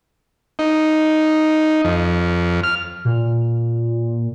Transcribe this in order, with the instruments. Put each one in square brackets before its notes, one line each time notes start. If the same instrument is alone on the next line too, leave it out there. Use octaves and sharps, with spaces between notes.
[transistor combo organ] D#4
F2
F6
[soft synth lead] A#2